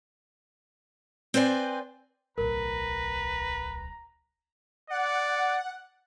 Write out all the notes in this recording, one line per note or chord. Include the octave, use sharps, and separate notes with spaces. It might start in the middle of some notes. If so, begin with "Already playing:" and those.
C4 B4 C5 D5 G#5
D1 B1 A#4 B4 A#5
D5 F#5